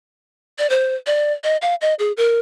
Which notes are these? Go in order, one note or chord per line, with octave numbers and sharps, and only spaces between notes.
D5
C5
D5
D#5
F5
D#5
G#4
A#4